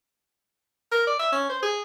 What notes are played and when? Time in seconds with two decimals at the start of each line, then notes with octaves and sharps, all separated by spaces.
0.92 A#4
1.07 D5
1.19 E5
1.32 C#4
1.49 C5
1.63 G#4